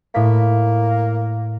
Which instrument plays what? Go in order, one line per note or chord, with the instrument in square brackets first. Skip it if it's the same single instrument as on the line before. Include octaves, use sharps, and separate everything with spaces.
[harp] A2 B6 [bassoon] A#3